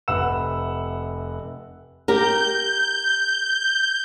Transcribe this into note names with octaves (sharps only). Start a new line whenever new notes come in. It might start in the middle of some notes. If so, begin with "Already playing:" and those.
F1 C3 B4 F#5 E6 E7
G4 A#4 G6